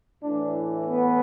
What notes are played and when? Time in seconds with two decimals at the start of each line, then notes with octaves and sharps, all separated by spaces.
0.22 A2 E3 D4
0.85 B3